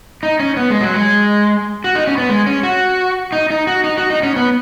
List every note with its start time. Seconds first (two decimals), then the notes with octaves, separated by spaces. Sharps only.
0.23 D#4
0.40 C#4
0.57 B3
0.70 G#3
0.81 F#3
0.94 G#3
1.84 F#4
1.95 D#4
2.07 C#4
2.18 B3
2.29 G#3
2.47 C#4
2.63 F#4
3.32 D#4
3.50 D#4
3.67 F#4
3.84 D#4
3.98 F#4
4.10 D#4
4.23 C#4
4.36 B3